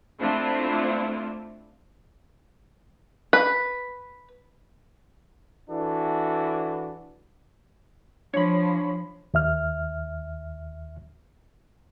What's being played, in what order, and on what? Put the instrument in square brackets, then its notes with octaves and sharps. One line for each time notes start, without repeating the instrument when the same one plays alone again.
[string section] A3 C4 D4 E4 F4
[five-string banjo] B4
[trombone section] E3 D4 E4 F#4 A4
[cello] F3 [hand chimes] D4 [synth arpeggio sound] C#5 B5
[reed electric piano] D#2 E5 F6